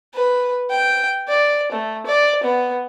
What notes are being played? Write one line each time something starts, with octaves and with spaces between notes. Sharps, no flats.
B4
G5
D5
A3
D5
B3